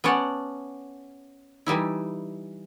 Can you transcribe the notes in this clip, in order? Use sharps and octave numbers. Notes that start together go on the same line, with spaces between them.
B3 C#4 D5 F#5 A5
E3 G3 D#4 E4